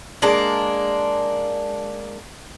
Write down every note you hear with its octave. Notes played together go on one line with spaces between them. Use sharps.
G#3 A#3 D4 A5